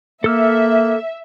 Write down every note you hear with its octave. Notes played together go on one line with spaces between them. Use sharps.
A#3 A4 E5 E6 F6